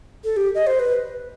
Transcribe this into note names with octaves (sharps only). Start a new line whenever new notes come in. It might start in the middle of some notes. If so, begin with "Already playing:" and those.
A4
G4
D#5
C5
B4